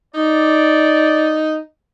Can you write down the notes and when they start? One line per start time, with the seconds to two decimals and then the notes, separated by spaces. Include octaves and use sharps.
0.14 D#4 D5